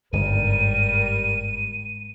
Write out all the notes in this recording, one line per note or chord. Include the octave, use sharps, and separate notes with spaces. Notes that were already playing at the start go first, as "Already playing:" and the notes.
G1 G#2 G3 A#4 D#7